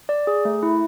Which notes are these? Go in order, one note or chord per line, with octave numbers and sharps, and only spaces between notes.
D5
G#4
A3
E4